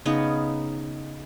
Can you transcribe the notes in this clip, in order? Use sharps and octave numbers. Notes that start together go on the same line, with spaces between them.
C#3 B3 D#4